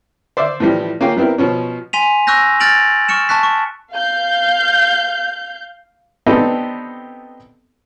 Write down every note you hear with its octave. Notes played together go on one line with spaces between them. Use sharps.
C5 D5 E5 F5
A2 E3 F3 G3
A#3 C#4 F4 G#4 F5 G5
G3 B3 C4 E4 A#4
B2 F3 C#4
G#5 C6 B6 D#7 F7
C#6 E6 F#6 G6 A#6
F6 G6 A6 D7 F7 F#7
C#6 F6 C#7 E7
A5 C#6 F#6 B6
C#6
F5 G6
B3 C4 D4 D#4 G4 A4